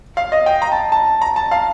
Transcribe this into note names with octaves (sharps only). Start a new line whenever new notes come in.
F5
D#5
G5
A#5
A5
A5
A#5
A5
F5